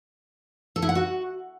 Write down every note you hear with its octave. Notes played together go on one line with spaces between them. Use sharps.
A4
E4
F#5
F#4